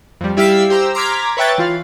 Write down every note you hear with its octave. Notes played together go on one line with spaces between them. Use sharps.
F2 G3
G3 E4 G4 F5 E6 B6
G4 C5 A#5 E6
A#5 C6 D6 F6 G#6 B6
B4 C#5 E5 G5 F#6 A6
E3 F4 F5